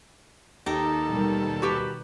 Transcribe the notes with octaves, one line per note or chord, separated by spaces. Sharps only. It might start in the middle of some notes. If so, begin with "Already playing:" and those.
D#2 D#4 G4 A4
B2 D#3 G3
F#4 G4 B4